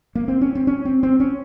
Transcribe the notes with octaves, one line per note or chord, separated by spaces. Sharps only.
A#3
C4
C#4
C4
C#4
C4
C4
C#4